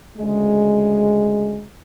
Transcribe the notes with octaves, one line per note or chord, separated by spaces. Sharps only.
D2 C#3 G#3